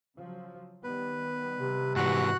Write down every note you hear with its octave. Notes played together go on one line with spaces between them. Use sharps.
C#3 F3 F#3
D#3 G3 B3 B4
C3
G#2 E3 F#4 F#5 F#6